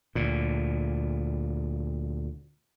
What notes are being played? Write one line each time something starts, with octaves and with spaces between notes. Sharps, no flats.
D2 A#2